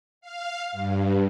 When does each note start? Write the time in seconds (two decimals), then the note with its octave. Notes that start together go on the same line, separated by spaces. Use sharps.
0.21 F5
0.72 G2